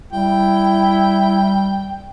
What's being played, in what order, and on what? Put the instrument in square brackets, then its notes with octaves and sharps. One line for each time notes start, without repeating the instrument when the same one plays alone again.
[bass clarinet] G3 [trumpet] E4 [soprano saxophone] G5